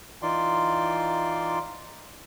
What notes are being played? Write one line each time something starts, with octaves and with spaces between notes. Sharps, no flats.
E3 D#4 F4 D5 C6 D6